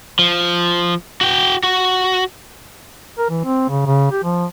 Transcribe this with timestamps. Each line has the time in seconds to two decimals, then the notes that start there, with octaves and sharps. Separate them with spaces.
0.19 F3
1.21 F#4 G5
1.63 F#4
3.18 A#4
3.30 E3
3.45 C4
3.69 C#3
3.86 C#3
4.12 G4
4.23 F3